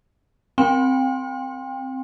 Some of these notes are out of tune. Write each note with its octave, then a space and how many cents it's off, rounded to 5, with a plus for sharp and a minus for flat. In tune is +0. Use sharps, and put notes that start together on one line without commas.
C4 +0 G5 +30 C6 +20